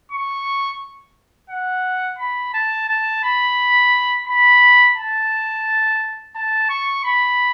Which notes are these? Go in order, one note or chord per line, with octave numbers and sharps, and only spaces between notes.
C#6
F#5
B5
A5
A5
B5
B5
A5
A5
C#6
B5